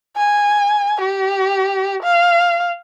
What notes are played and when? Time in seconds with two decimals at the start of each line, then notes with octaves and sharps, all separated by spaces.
0.17 G#5
1.01 G4
2.03 F5